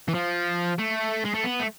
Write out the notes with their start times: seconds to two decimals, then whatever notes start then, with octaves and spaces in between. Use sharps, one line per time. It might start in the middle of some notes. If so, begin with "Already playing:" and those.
0.08 E3
0.14 F3
0.79 A3
1.25 G#3
1.34 A3
1.43 B3
1.60 A3